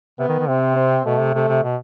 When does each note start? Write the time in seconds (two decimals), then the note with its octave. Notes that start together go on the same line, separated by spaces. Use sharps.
0.19 C3 B3
0.28 D#3
0.39 D#3
0.48 C3 C4
0.76 C4
1.05 B2 A3
1.20 C3
1.34 C3 A3
1.49 C3
1.63 B2